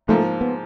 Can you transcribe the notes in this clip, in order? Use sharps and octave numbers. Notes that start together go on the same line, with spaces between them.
G#2 F3 A3 A#3
B3